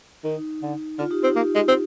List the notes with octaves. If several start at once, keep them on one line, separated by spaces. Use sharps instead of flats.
D#3 D#4
D3
D3 F4
D#4 G4
C4 D#4 G4
A#3
G#3
C4